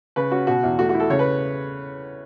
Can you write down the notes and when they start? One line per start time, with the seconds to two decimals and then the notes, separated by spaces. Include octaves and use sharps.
0.16 C#3 B4
0.31 C#4 F#4
0.47 B2 F#4
0.63 E2
0.78 A3 F#4
0.89 F#4
0.94 E4
1.00 A4
1.10 C#3 C#5
1.19 B4